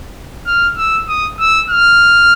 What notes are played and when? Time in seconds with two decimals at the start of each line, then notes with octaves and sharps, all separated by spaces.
0.46 F6
0.77 E6
1.08 D#6
1.39 E6
1.70 F6